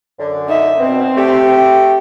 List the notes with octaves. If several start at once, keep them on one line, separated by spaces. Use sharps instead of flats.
F#2 D3
D#4 E5
B2 C4
A3 G4